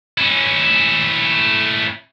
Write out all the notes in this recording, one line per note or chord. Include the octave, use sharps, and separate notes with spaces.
C#4 E4